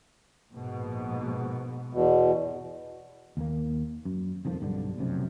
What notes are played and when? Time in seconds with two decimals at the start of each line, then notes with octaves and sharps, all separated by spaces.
0.51 A#1 G#2 B2
1.93 E2 B2
3.37 D#2 A#3
4.05 F#2
4.45 D#1 F2 D#3 F3
4.60 B1 G2 D3
4.98 F1 B1 F#2 C3